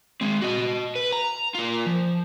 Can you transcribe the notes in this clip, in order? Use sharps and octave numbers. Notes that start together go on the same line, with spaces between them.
G#3 C4
F#4 D#5
B4
A#5
F4 A#4
F3